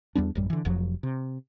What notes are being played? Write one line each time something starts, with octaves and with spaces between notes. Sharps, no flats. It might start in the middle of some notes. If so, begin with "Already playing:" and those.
E2 G3 B3 D4
A1 F#2 G3
D3 E3
F1 F2 F3 F#3
C3